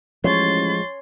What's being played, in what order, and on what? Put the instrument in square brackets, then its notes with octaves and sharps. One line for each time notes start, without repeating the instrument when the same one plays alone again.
[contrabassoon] A1 [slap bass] F3 G#3 [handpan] C#5 [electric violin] C6 A6